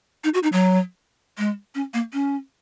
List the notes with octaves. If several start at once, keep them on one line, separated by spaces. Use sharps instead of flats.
D#4
F#4
D#4
F#3
G#3
C#4
A#3
C#4